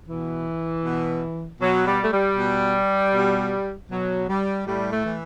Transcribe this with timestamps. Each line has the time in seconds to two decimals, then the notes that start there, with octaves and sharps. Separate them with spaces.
0.08 B2 E3
0.85 B2
1.61 B2 F#3
1.86 G3
2.03 A3
2.12 G3
2.37 B2
3.14 B2
3.90 B2 F#3
4.29 G3
4.66 A2 G3
4.92 A3
5.05 E3